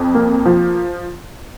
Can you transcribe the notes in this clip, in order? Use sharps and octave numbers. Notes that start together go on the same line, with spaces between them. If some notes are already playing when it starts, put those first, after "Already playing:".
Already playing: F2
A#3
F3